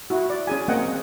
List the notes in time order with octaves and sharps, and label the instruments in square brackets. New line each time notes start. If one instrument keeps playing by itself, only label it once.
[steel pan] E4 F#4
D5
C#4 G#4 G#5
A#3 C4 D#5 F#5 G5